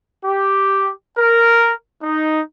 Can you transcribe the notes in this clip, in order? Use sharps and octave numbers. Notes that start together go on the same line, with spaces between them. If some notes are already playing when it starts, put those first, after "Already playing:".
G4
A#4
D#4